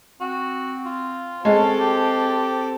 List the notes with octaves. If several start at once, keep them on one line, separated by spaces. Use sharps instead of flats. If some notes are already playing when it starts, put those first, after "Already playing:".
C4 F#4
F4
G#3 C4 C#4 A4 A5
G4